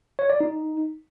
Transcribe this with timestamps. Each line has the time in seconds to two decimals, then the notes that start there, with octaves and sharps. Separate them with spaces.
0.19 C#5
0.30 D5
0.40 D#4